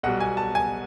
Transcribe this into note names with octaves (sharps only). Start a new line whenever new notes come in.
B1 B2 G3 F#5
G#5
A5
G#5